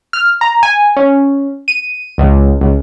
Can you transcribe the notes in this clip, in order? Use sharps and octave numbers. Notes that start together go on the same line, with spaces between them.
F6
A#5
G#5
C#4
D#7
C#2
C#2